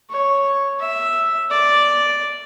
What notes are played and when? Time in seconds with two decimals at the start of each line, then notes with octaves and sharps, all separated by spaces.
0.11 C#5
0.80 E5
1.51 D5